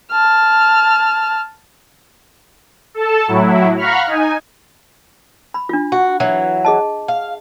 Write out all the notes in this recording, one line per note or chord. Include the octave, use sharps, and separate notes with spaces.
A5 F6
A4 A5
A2 F#3 E4
F5 F#5 A#5 B5 C#6 F6
D#4 G#5
B5
D4 F4
F#4
E3 F#3
G#4 D#5 A5
F5